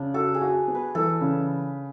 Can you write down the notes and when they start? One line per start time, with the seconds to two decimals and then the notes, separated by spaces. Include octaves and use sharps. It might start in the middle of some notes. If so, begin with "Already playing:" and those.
Already playing: C#3 D4
0.14 F#4 A4
0.34 G#4
0.42 F#4
0.68 B3
0.75 B4
0.95 E3 A4
1.21 C#3